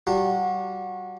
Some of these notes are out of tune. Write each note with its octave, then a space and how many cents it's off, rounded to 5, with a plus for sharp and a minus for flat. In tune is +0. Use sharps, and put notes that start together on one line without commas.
G3 -30 F#4 -25 A5 +45